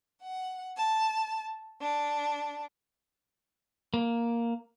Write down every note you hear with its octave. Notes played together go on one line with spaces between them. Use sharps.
F#5
A5
D4
A#3